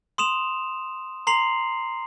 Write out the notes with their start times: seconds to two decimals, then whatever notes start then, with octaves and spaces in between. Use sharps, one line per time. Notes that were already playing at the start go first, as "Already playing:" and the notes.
0.18 C6 D#6 E7 F7
1.27 A#5 C6 C7 F7 F#7